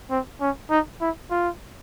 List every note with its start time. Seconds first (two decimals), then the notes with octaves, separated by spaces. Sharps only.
0.10 C4
0.41 C#4
0.70 D#4
1.01 E4
1.31 F4